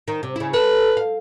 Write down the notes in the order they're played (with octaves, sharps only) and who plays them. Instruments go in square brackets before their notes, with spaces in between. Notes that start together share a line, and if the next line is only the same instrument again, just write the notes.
[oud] D#3
C3
C#3 E4
[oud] A4 [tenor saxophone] B4
[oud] F5